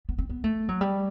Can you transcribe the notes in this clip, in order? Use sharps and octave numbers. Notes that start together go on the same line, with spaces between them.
B3
C4
B3
A3
F#3
G3